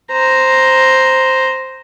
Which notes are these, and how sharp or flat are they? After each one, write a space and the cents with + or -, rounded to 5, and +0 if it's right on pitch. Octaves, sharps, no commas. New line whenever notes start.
C5 +0 A#5 +0